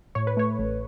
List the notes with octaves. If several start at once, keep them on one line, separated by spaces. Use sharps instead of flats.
A2 C#5
B4
A3 C#5
A1